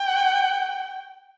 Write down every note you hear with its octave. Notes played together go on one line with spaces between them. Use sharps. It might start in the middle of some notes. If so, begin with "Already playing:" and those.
Already playing: G5